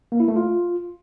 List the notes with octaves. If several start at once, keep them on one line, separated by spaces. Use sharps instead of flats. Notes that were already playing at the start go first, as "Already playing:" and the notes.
A#3
E4
A3
F4